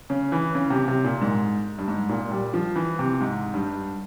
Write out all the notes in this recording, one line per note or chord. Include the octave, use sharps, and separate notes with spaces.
C#3
E3
C#3
C3
C3
A#2
G#2
G2
G#2
A#2
G3
F3
E3
C3
G#2
G2